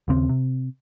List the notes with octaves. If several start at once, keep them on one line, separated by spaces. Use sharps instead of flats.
D#2 C#3 C4
C3